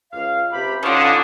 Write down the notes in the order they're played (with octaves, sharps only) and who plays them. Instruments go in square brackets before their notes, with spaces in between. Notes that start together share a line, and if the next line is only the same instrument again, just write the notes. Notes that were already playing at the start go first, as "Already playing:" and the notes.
[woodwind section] C#2 F5
C3 G4 B5
[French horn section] D3 [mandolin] C#4 F4 [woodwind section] D#4 D6 D#6